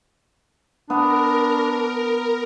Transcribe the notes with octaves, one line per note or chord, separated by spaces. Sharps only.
B3 D4 A#4